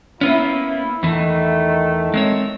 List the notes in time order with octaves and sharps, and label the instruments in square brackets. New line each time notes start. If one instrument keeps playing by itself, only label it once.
[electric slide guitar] A#3 B3 C#4 [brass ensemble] E4
[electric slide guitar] E2 E3 [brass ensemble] D#3 A3
[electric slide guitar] G#3 C4 C#5